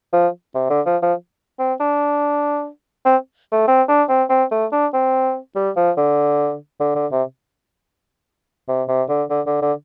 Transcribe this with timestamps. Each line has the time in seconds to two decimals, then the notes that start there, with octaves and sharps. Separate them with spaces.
0.13 F3
0.55 C3
0.70 D3
0.86 F3
1.03 F3
1.59 C4
1.80 D4
3.06 C4
3.52 A3
3.68 C4
3.88 D4
4.09 C4
4.30 C4
4.51 A3
4.72 D4
4.93 C4
5.56 G3
5.76 F3
5.97 D3
6.80 D3
6.95 D3
7.12 C3
8.68 C3
8.88 C3
9.09 D3
9.30 D3
9.47 D3
9.62 D3